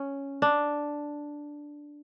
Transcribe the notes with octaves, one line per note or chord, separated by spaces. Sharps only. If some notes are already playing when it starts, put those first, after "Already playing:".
Already playing: C#4
D4